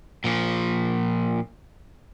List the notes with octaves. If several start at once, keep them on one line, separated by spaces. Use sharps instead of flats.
A#2 F3